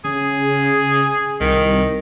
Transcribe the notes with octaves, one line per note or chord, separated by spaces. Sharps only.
C#3 G#4
C2 D#3